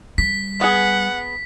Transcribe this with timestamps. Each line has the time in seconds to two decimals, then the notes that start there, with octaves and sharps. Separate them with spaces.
0.18 G3 B6
0.61 B3 G#4 F#5